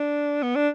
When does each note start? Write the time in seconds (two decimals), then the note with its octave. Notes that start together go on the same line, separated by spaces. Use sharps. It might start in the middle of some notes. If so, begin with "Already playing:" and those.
Already playing: D4
0.43 B3
0.56 D4